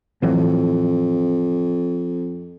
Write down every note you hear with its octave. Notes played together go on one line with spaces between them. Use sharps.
F2 A2 E3 F#3